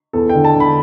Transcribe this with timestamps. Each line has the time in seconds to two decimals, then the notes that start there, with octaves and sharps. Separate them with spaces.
0.13 E2 A4
0.29 D3 G5
0.44 A5
0.54 D3
0.60 B5